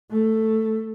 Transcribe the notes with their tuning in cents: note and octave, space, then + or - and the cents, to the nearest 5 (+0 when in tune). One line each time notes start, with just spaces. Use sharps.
A3 +5